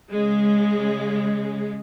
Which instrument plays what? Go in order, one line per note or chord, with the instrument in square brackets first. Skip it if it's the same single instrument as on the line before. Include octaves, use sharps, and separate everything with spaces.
[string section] C#3 G#3